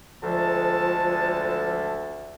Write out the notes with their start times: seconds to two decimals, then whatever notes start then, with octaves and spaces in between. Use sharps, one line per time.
0.23 D2 F3 G#3 A4 A5